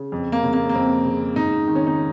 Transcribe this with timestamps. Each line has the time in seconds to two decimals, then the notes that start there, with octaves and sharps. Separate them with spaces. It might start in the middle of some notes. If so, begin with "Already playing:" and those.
Already playing: C#3
0.12 F2
0.32 A#3
0.43 C#3
0.53 A#3
0.69 A#3
0.74 F2 C4
1.05 C#3
1.36 G#2 D#4
1.67 D#3
1.75 C#4
1.86 D#4